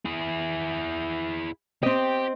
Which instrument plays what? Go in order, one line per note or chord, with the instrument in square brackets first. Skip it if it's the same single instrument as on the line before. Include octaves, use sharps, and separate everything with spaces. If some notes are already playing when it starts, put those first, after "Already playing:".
[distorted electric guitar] E4 G#4
[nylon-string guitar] C4 D#5 [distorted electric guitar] G4